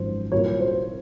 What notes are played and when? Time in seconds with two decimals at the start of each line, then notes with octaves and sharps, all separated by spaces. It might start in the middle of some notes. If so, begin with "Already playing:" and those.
Already playing: G#1 F#2 F3 C5
0.32 C2 A#2 F#3 C#5
0.60 C5